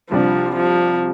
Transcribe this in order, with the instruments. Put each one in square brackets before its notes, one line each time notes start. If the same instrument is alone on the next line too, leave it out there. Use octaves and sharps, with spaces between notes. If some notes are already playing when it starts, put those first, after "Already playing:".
[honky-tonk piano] C2 C3 G3 D4 [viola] F3
[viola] F3